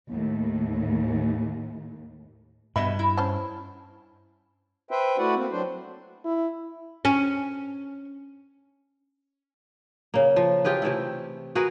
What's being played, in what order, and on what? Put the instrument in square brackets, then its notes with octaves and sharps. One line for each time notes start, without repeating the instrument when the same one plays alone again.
[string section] D#2 A2
[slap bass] G2 [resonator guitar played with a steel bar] B2 D#5 E5 [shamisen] B5
[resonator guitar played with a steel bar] E4
[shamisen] C#4 C5 A5
[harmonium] B4 C5 E5 G5
A3 E4 F#4 B4 D5 F#5
A#3 C4
F#3 D4 C5
[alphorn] E4
[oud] C#4
[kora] C#3 A#3
F3
F4 G4 G#4 B4
C3 E3 A3 E4
F#4 G#4 A#4 B4